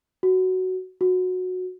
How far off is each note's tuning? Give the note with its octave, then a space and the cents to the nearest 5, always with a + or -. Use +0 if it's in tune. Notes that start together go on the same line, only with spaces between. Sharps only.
F#4 +10
F#4 -15